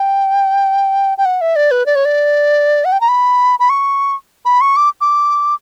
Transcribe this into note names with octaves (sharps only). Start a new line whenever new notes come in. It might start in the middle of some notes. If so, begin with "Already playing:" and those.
Already playing: G5
G5
F#5
E5
D5
B4
D5
C#5
D5
F#5
G5
A#5
B5
B5
C#6
B5
C#6
D6
D6